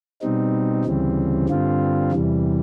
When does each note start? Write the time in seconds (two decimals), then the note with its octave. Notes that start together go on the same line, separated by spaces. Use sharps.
0.21 B2 G3 C4 D#4
0.85 D2 C#3 E3 G3 C4
1.49 G2 D3 G3 C4 F4
2.12 E2 C3 E3 G3